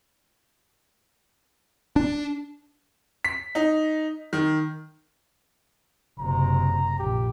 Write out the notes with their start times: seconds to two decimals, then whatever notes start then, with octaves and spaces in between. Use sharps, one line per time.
1.96 D4
3.24 B6
3.55 D#4
4.33 D#3
6.19 F#1 C3 A#5
6.99 A#1 G4